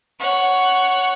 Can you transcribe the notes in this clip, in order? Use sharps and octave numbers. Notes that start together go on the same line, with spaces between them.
C#5 F#5